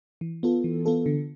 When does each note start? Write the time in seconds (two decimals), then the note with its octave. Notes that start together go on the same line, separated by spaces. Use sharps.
0.21 E3
0.43 B3 F4 A4
0.64 E3
0.86 B3 F4 A4
1.06 D3